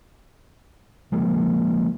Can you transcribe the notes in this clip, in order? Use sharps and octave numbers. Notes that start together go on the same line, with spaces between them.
C#3 F3 G#3 A#3